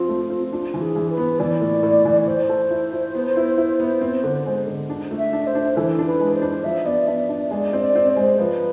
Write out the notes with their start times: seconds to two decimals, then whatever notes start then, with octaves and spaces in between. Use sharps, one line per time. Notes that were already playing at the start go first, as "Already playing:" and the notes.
Already playing: F3 C4 F4
0.09 A3
0.30 C4
0.52 D4 F4
0.74 E3
0.81 G#4
0.96 E3
1.10 B4
1.17 B3
1.39 E3 D5
1.61 A2
1.83 A2
2.05 E3
2.27 C5 D5
2.49 A4
2.71 E4
2.92 E4
3.15 B3
3.37 E4
3.58 E4
3.80 B3
4.01 C4
4.24 D3
4.46 G#3
4.67 D3
4.90 D4
5.11 A3
5.18 E5
5.33 D4
5.47 C5
5.55 D4
5.76 E3 A4
5.99 D4
6.06 B4
6.20 G#3
6.35 C5
6.41 D4
6.64 F3 E5
6.85 B3 D5
7.07 D4 E5
7.29 D4 D5
7.51 G#3 D5
7.73 C4
7.81 D5
7.95 C4
8.09 C5
8.16 G#3
8.39 F3 B4